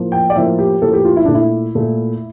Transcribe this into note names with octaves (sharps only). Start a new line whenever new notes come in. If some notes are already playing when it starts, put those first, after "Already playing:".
Already playing: A2 F3 A#3
G5
D5
A2 F3 A#3 E5
G4
A2 F3 A#3 A4
G4
F4
E4
A#2 A3 D4
E4
A#2 A3